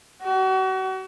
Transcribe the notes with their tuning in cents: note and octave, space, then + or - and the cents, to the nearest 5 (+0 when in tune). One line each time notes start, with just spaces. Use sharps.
F#4 +35